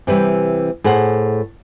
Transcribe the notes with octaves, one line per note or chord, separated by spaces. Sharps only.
C3 E3 G3
A2 G#4 C5 F#5